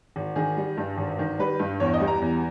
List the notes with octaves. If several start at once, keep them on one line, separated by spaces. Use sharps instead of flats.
G#1
D#3 G#4
G3
G2
G#1
D#3
G3 B4
G2
E2 C#5
D#5
G3
A#5
E2